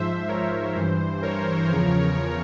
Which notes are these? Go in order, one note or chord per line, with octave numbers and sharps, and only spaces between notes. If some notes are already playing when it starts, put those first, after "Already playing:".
Already playing: G#2 F3 C5 E5
A#4 C#5
G2 E3 C5
A#4 C#5
E2 C#3 F3